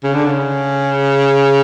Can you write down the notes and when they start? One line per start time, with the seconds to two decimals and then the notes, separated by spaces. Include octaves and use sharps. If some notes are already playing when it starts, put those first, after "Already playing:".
0.04 C#3
0.15 D3
0.26 C#3